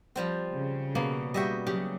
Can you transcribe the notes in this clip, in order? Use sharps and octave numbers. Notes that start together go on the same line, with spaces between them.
F3 G3 C4
C#3
B2 A#3
G3 F#4 D#5 E5 G5
C#3 F#3 G4